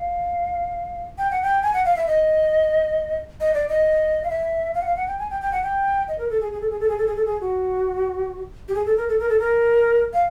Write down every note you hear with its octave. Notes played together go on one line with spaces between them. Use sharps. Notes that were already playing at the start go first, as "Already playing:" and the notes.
Already playing: F5
G5
F#5
G5
G#5
F#5
F5
E5
D#5
D#5
D5
D#5
F5
E5
F5
F#5
F5
F#5
G5
G#5
G5
G5
F#5
G5
D#5
A#4
A4
G#4
G#4
A4
G#4
A4
G#4
A4
G#4
A4
G#4
F#4
G4
G#4
A4
A#4
A4
A#4
A4
A#4
F5